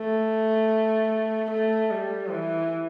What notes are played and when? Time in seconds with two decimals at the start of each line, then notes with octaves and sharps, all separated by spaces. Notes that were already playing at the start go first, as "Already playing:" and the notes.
Already playing: A3
1.50 A3
1.91 G3
2.31 E3